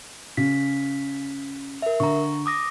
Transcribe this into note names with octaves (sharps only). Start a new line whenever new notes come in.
C#3 B6
A#4 E5
D3 A#5 C#6
D6 D#6 A#6